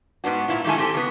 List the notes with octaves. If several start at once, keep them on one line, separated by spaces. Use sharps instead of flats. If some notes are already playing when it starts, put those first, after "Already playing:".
G#2 B3 D4 F#4
A#2 E4 F4
G#2 D#3 G3 A3 E4 G#5
C4 G4 A4
C#3 B3